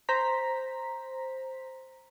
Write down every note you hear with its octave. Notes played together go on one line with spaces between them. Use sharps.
C5 A#5 B6